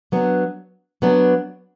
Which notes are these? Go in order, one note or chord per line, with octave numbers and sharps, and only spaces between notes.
F#3 B3 D4
F#3 B3 D4